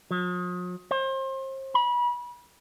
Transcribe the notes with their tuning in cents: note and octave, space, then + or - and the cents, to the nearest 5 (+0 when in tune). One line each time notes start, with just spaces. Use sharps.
F3 +45
C5 +35
B5 -30